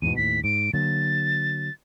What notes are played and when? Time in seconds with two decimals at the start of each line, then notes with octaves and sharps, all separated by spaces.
0.02 E2 G#2 B2 D#7
0.16 D#2 A2 B6
0.44 G#2 D7
0.74 D3 F#3 A#3 A6